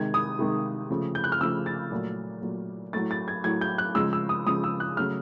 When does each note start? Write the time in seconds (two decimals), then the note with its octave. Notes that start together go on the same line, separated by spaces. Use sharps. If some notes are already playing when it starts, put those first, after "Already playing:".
Already playing: C3 D#3 G#3 G#6
0.14 D#6
0.39 C3 D#3 G#3
0.90 C#3 F3 A3
1.15 G6
1.24 F#6
1.32 F6
1.41 C#3 F3 A3 E6
1.66 A6
1.91 A#2 F#3 A3
2.42 A#2 F#3 A3
2.93 A2 F#3 A3 A6
3.11 A6
3.28 G#6
3.44 A2 F#3 A3 G#6
3.61 G6
3.78 F#6
3.95 C#3 F3 G#3 E6
4.13 E6
4.29 D#6
4.46 C#3 F3 G#3 D#6
4.64 E6
4.80 F#6
4.97 C#3 F#3 A3 F6